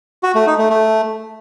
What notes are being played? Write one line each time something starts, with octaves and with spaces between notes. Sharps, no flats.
F#4
A3
D#4
A3
A3